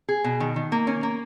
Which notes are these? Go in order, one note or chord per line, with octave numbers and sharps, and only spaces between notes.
G#4
B2
D#3
D#3
A#3
C#4
A#3